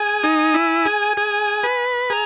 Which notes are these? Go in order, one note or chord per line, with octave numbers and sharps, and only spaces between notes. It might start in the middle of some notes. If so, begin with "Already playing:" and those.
Already playing: G#4 G#5
D#4
E4
G#4
G#4
B4
G#4 A#5